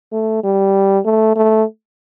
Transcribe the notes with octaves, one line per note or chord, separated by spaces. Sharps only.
A3
G3
A3
A3